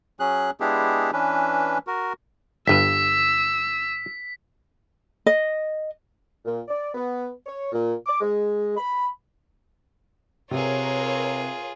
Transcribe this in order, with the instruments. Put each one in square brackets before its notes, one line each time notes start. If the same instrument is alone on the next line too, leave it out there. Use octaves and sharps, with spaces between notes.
[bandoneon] F#3 C#4 G#4 F#6
G#3 B3 D4 E4 G4 G#4
E3 C#4 D4 B4
F#4 A#4
[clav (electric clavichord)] G1 G2 B4 [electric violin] E6 [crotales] B6
[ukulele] D#5
[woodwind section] A#2
D5
B3
C#5
A#2
D6
G#3
B5
[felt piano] C3 [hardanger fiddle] F4 G#4 [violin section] A#4 B4 C#5